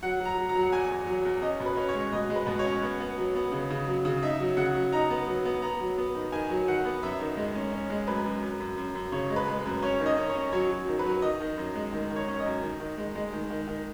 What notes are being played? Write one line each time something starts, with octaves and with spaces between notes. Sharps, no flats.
F#3 F#5
F#3
A#5
F#3
A#5
F#3
F#5
E2 G#5
E2
F#3
E2
C#4 D#5
B2
B4
C#4
C#5
G#3
B2 D#5
G#3
B4
B2
C#5
C#4
B3
B3
F#3
B3
C#3
C#3
F#3
C#3
D#4 E5
F#3
C#3 F#5
F#3
D#4 A#5
B3
F#3
B3
B3 A#5
F#3
B3
D#3
D#3 G#5
F#3
D#3 F#5
B3
F#2 E5
D#3
G#3
C#4
C#4
G#3
F#2 B4
F#2
F#2
F#2
F#2
F#2
C#3 C#5
G#3
B4
G#3
B4
F#2
C#4 C#5
D#3
D#5
C#4
C#5
C#4
F#3 C#5
F#3
D#3
B4
F#3
D#3 D#5
D#3
F#2
G#3
D#3
D#3
C#5
C#4
D#5
F#2
D#3
D#3
G#3
G#3
D#3
D#3
D#3